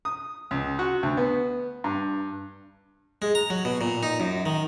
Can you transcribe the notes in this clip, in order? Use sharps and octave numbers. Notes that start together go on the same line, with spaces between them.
D#6
C#2
F#4
D2
B3
G2
G#3
A#5
F#3
B2
A#2
D#4
F#2
D#3